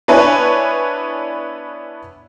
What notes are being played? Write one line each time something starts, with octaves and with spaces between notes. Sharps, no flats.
B3 D4 E4 B4 C#5 G#5